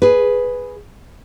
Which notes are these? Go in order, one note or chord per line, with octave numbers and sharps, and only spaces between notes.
G#4 B4